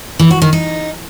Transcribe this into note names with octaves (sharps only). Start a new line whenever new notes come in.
E3
F#4
D#3
D#4